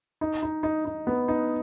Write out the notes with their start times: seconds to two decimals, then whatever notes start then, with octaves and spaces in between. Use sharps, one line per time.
0.21 D#4
0.43 D#4
0.63 D#4
0.85 D#4
1.07 B3
1.28 D#4